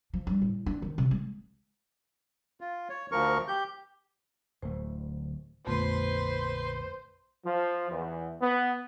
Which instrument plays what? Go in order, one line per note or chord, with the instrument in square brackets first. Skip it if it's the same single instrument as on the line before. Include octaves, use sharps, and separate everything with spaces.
[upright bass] F3
G2
A2
D4
D#3
C3
G#3
[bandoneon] F4
C#5
D2 F3 A#4 C#6
G4 G6
[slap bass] D1 D2 A3 [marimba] C5
[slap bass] A#1 D3 [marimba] F2 A3 B3 [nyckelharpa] B4 C6 [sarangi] C5
[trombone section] F3
E2
B3